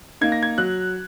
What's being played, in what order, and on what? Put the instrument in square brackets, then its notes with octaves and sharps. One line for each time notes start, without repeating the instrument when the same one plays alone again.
[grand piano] A#3 D#4 G#6
A#6
G#6
F#3 F#6